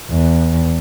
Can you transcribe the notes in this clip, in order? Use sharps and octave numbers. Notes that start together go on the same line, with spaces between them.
E2